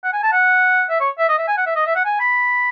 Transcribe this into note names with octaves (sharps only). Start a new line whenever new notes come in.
F#5
G#5
A5
F#5
E5
C#5
E5
D#5
E5
G#5
F#5
E5
D#5
E5
F#5
G#5
B5